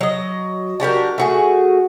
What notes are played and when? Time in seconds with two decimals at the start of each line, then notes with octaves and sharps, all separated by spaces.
0.01 F#3 D#5
0.80 D4 F#4 G4 A#4
1.18 A3 F#4 G#4